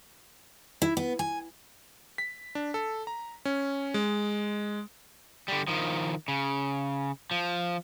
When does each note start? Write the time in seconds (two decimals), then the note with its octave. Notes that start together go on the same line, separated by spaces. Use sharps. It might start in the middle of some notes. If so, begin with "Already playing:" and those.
0.82 E4
0.97 B3
1.19 G#5
2.18 B6
2.55 D4
2.74 A4
3.07 A#5
3.45 C#4
3.94 G#3
5.48 D3 G3
5.68 D#3 F3
6.28 C#3
7.31 F3